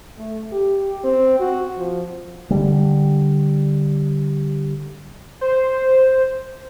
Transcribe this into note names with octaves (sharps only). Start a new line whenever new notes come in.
A3
G4
C4
F#4
F3
D3 G3
C5